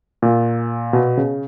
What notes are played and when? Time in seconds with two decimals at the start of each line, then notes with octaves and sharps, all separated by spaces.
0.22 A#2
0.93 B2
1.17 C#3